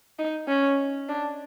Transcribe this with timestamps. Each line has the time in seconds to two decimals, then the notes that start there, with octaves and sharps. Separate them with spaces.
0.19 D#4
0.48 C#4
1.09 D4